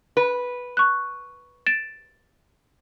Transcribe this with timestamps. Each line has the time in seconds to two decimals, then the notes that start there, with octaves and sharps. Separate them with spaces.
0.17 B4
0.77 C#6 F#6
1.66 A6 D7 E7